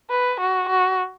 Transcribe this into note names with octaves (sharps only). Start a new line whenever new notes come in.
B4
F#4
F#4